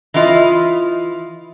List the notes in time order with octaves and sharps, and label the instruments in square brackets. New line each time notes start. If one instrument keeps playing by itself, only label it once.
[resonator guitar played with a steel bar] E3 E4 F4 D#5